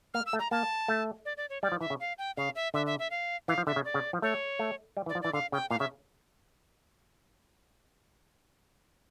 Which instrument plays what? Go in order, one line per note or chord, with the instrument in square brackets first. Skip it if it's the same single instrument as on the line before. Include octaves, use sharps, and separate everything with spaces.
[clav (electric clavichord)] A#3 [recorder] F6
[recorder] E6
[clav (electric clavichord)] A3
[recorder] A#5
[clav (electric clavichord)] A#3 [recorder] A5
[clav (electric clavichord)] A3
[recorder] D5
D5
C#5
[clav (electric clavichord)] G3 [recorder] D5
[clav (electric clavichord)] F3
[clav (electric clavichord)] E3 [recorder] E5
[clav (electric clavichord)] C#3
[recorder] F5
G5
[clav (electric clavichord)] C#3 [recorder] F5
[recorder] E5
[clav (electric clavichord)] D3 [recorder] E5
[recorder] E5
E5
F5
[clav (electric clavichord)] E3 [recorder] F5
[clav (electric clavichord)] F3
[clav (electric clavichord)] D3 [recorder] E5
[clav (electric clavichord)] C#3
[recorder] D5
[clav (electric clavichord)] C#3
F3
[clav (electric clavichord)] A3 [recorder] C#5
[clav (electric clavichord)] A3
G3
E3
[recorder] D5
[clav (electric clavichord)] F3
[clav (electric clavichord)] E3 [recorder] D5
[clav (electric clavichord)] D3 [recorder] F5
[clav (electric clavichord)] C#3 [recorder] G5
[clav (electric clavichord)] A#2 [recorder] F5
[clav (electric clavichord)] C#3 [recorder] E5